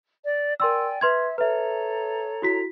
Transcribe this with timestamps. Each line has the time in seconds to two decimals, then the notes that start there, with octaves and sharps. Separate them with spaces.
0.24 D5
0.60 A#4 D5 G5 G#5 C6 E6
1.01 B4 E5 C6 G#6
1.38 A4 B4 C#5 E5 A#5
2.42 E4 F#4 B6